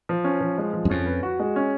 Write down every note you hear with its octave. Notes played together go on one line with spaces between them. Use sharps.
F3
C#4
F3
G#3
F3
F#2
F2 C#4
B4
F#4
G#3
C#4